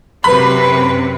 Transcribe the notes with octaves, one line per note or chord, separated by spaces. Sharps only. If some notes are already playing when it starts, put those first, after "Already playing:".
F#2 C3 B4 B5